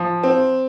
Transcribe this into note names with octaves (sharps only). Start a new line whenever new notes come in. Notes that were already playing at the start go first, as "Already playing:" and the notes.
Already playing: F3
C4